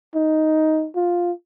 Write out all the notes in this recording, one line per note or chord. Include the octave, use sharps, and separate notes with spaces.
D#4
F4